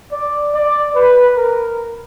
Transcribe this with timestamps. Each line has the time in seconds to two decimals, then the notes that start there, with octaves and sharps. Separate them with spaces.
0.12 D5
0.54 D5
0.95 B4
1.37 A#4